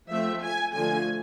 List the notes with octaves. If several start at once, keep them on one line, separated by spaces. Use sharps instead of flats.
F3 A3 C4 E5
G#5
D3 F3 A3 G#5